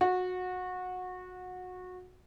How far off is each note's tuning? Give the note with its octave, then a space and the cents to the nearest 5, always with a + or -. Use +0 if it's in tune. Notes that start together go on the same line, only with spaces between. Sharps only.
F#4 -20